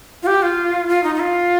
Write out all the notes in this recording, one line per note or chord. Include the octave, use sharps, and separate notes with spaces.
F4
G4
F4
F4
D#4
D#4
F4